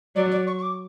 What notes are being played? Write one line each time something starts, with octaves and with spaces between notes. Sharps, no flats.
F#3 D5
D5
C#6
C#6
D6